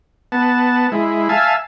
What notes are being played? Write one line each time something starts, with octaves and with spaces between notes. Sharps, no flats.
B3 A5
G#3 E4
E5 F5 G#5 A5